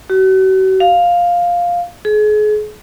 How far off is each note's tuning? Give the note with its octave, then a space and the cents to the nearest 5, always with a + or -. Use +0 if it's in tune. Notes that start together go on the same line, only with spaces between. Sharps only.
F#4 +40
F5 +5
G#4 +35